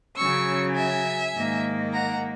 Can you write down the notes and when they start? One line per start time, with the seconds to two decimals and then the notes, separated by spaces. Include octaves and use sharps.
0.17 C#3 F#3 C#4 C#6 E6
0.75 E5 G#5
1.34 G#2 D#3 A#3
1.93 F#5 A#5